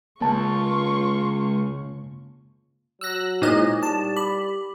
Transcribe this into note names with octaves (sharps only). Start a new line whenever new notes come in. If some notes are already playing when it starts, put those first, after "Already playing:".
C#2 C#3 A#3 F4 A5 C#6
F#3 E6 F#6 A#6
A#2 G#3 D#4 E4 A#4 D#5
G3 A5
B5 D6